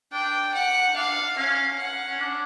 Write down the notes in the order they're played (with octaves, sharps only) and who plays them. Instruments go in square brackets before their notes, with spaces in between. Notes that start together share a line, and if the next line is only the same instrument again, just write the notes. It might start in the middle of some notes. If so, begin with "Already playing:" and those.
[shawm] D4 [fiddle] G5
[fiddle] F#5
[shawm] D4 [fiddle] F5
[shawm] C#4 [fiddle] F5
[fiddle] F#5
[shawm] C#4
D4